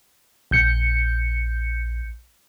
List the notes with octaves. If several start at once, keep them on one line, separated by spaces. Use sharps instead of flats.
A#1 G6 C#7